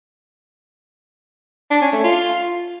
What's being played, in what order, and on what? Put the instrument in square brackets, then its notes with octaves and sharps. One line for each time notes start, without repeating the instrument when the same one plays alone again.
[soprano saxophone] D4
C#4
A3
F4